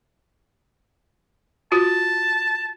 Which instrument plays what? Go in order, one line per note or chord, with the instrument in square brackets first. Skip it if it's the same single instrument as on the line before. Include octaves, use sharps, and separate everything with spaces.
[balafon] F4 F#4 [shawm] A5